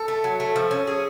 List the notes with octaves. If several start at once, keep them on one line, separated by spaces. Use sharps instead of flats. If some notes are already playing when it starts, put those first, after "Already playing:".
Already playing: A4
A3
F#3
A3
F3
C#4
G#4